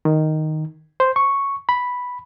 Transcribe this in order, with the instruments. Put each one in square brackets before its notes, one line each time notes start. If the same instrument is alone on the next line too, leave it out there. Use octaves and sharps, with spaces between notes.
[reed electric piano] D#3
C5
C#6
B5